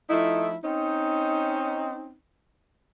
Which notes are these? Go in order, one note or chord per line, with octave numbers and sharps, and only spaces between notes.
F3 A3 D#4 E4
C4 C#4 D#4